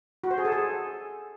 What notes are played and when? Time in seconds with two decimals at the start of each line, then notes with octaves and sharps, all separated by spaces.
0.24 F#4
0.31 C5
0.38 G#4
0.45 A4
0.52 G#4